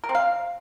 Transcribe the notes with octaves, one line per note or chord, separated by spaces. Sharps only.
A#4
C4
F5